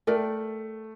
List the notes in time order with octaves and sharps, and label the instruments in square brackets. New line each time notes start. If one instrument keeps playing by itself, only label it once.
[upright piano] A3 [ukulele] A#4 D5 G5